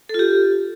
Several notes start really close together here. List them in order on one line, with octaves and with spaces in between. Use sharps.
A4 F4 G4